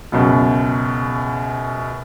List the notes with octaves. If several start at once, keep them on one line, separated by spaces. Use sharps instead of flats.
C#2 F#2 B2